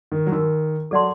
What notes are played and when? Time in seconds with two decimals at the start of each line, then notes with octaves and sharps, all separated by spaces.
0.12 D#3
0.26 F#3
0.32 D#3 D#4 F#4 A#4
0.91 F#3 A4 D5 F#5 A5 C6